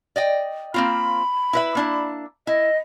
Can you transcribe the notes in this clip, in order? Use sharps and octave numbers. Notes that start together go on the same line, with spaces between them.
D5 D#5 G5
A#3 C4 F4 B5
E4 B4 E5
A#3 D4 E4
E4 D#5